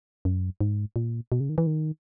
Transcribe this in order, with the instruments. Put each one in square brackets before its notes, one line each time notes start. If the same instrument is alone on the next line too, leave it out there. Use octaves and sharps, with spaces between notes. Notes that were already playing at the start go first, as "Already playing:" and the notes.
[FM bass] F#2
G#2
A#2
B2
C#3
D#3
E3
D#3